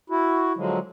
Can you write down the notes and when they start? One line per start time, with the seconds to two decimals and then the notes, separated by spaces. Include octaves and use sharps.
0.10 E4 F#4
0.57 D3 F3 F#3 G#3